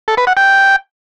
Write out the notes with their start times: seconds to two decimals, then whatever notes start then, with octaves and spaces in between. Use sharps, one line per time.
0.08 A4
0.17 B4
0.27 F#5
0.37 G5